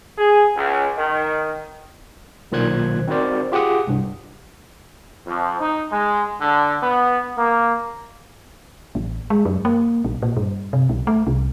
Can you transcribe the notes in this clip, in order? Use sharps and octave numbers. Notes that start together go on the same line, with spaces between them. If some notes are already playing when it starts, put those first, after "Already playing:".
G#4
C#2
D#3
B1 A#2 D#3 C5 F#6 G#6
C4 D#4 F#4 A#4 C5 D5
F4 G4 G#4 F#5 D#6
C2 G2
F2
D#4
G#3
D3
B3
A#3
A1
G#3
F#2
A#3
A#1
A#2
G2
C3
B1
A3
C2